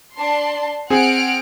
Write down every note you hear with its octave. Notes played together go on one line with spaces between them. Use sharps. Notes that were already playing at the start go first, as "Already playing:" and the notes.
D4 A5 C6
C4 G#4 F#5 F6 D7